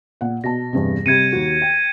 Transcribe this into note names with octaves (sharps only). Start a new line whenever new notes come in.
A#2 F#5
B2 A5 A#6
E2 G2 C3
C3 G3 G#6 C#7 D#7
D#2 F#4
G5